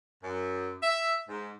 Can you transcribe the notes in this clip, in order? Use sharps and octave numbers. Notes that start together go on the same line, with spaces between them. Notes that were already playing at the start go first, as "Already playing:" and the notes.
F#2
E5
G#2